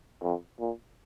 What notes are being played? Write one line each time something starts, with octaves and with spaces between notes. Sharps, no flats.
F2
A#2